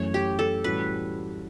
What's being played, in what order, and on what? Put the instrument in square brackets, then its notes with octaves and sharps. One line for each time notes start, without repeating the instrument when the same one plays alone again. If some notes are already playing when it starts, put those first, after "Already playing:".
Already playing: [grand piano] F#2 E3 A3 [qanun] C#5
[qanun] G4
A4
[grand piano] A2 E3 G3 C#4 F#4 [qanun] B4